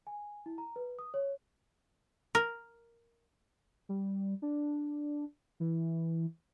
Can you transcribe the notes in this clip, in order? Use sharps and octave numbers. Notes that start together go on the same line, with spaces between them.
G#5
E4
A#5
B4
D#6
C#5
A#4
G3
D4
E3